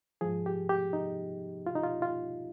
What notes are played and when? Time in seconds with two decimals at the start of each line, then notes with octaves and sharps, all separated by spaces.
0.21 G#2 F3 G#4
0.46 G4
0.69 G4
0.93 D#4
1.66 F4
1.75 D#4
1.83 F4
2.02 F4